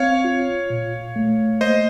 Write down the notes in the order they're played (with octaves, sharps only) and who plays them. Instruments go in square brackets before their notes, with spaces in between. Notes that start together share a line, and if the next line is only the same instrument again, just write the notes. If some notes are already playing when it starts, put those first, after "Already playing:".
Already playing: [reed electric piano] C4 [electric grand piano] C#5 F5
[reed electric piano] F4
A#2
A3
[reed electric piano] A#3 [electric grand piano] C5 D#5